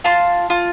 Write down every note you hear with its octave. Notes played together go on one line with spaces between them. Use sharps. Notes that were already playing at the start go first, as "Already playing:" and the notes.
F4 A5 C6
F4